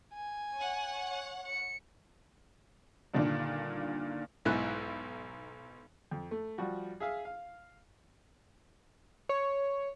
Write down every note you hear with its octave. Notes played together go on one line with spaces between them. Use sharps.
G#5
C#5 F#5
C#7
G2 A#2 D3 D#3 D4
B1 G#2 E4 F#6
F2
A3
F3 G3 F#4
G#4 E5 F5
F5
C#5